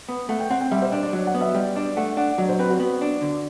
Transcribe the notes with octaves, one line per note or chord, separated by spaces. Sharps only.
B3
A3 F#5
G5
C4 F#5
G5
G3 E5
C5
D4 D5
D5
F#3 D5
F#5
B3
E5
G3 D5
D4 D5
A3 F#5
D4 F#5
F#3 D5
C5
C4 B4
F#4
B3
D4
D3